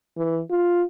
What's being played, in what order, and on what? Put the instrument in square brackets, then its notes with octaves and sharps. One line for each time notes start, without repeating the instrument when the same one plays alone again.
[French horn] E3
F4